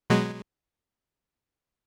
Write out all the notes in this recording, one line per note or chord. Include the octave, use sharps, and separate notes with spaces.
B2 F#3 G#3